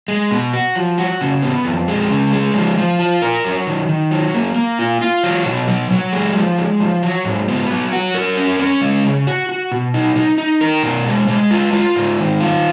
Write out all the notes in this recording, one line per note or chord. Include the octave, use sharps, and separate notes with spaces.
G#3
B2
F#4
F3
F#4
C#3
B3
F2
G#3
C#3
G#3
F3
F3
F4
A#4
F#3
D#3
D#3
F#3
A#3
A#3
F4
F4
F#3
B2
F#3
F#3
G#3
F3
G#3
F3
F#3
G#2
B3
F#3
F#4
A#4
C#4
C#4
G#3
C#3
F#4
F#4
B2
D#4
D#4
D#4
A#4
B2
G#3
G#3
F4
F4
G#2
D#3
F4